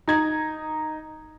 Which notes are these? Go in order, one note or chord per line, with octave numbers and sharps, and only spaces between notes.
D#4 G#6